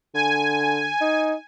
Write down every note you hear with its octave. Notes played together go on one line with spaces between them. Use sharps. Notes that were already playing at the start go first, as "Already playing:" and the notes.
D3 G#5
D#4